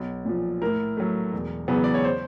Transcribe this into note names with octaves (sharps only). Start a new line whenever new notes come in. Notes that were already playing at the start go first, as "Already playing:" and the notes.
Already playing: B1
A#2 F3
A2 A#4
F#3 A3
E1
E2 C#3 F#3 B3
D5
C#5
C5